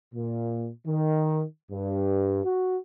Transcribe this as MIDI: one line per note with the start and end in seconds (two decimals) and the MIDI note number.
0.14 0.70 46
0.87 1.42 51
1.72 2.44 43
2.45 2.78 66